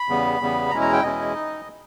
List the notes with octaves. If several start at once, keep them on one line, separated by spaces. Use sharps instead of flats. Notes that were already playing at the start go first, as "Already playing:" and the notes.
Already playing: B5
E2 C#3 G3 B3
E2 C#3 G3 B3
E2 B2 G#3 C#4 E4 A#5
A#5
G5
E2 B2 G#3 C#4 E4 D#5
D#4